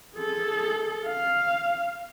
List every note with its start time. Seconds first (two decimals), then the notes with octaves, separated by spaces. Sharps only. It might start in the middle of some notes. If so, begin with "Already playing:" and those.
0.15 G#4 A4
1.06 F5